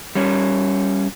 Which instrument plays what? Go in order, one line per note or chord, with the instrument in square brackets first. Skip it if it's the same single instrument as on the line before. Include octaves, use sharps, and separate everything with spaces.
[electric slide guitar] G3 C#4